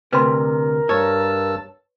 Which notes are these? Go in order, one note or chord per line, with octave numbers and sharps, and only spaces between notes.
D2 C3 A#4 B4 C6
G2 C#5 A5 E6